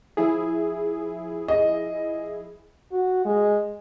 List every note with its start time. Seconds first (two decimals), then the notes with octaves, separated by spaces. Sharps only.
0.17 F3 E4 G#4
1.48 D#5
2.92 F#4
3.25 G#3